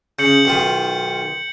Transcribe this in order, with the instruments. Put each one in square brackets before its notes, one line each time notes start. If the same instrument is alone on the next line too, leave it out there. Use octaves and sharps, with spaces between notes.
[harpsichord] C#3 [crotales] G6 C#7 F#7
[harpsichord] B1 D#3 F4